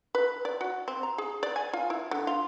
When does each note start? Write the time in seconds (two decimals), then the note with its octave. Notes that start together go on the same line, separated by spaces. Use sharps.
0.15 B4
0.45 D5
0.61 F#4
0.88 C4
1.03 A#5
1.18 G#4
1.43 D5
1.56 G#5
1.73 F4
1.90 E4
2.11 D3
2.27 F4